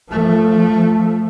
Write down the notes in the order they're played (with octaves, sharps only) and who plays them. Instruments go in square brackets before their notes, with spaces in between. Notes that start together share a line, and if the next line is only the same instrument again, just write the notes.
[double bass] F3 A3